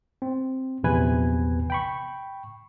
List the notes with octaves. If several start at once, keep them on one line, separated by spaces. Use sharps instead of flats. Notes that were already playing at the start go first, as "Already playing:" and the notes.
C4
A#1 E2 C3 B4 G#5 G#6
G5 B5 C#6